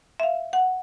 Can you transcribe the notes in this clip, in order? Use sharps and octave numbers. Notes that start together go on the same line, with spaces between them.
E5 F5
F#5